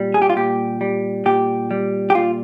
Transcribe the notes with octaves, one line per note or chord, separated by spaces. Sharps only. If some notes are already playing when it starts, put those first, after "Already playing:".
Already playing: A#2 G3
G#4
G4
F4
A#2 G4
G3
A#2 G4
G3
G4
A#2 F4